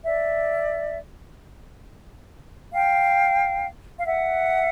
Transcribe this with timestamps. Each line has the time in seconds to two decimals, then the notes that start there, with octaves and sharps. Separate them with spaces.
0.04 D5 E5
2.72 F5 G5
3.98 F5
4.06 E5 F#5